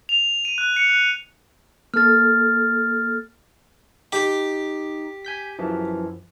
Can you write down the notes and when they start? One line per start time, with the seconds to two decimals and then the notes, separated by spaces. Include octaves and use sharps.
0.09 F7
0.45 D#7
0.58 F#6
0.76 C#7
0.89 F#6
1.94 A#3 A4 F6 A6
4.13 D#4 G4
5.25 G#5 G6 B6
5.59 F#2 E3 F3